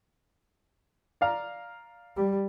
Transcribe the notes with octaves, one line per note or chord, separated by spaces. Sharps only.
D5 F5 A#5
G3